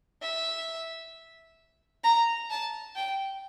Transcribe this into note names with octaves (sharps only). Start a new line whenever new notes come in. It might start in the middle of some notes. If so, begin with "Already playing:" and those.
E5
A#5
A5
G5